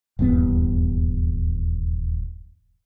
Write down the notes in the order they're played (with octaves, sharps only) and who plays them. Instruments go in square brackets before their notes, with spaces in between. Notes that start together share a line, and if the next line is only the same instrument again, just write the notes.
[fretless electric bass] D#1 E2 G2 B3